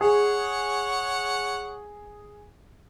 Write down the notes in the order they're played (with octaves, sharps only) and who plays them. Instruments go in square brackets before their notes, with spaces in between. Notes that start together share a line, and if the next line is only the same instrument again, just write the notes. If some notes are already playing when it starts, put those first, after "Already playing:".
[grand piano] G#4 [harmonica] C#5 F#5